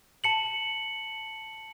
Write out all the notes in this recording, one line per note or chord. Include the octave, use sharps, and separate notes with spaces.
A5 C#7 F#7